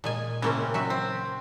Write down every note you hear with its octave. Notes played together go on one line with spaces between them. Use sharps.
A#2 G#3 G#5
C#3 E3 G3 A#3 C4 C#4
F#3 F#4 E5
C4